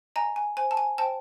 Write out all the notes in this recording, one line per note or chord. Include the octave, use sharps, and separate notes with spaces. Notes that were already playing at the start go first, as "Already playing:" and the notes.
D#5 G#5 A#5
G#5
C5 G#5
A5
G#5
C5 G5 A5